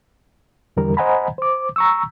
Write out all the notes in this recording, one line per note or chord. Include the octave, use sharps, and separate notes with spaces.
E2 D3 E3 G3 A#4
C5 D#5 F#5 G#5 A#5 B5
C5 D6
A#5 C#6 E6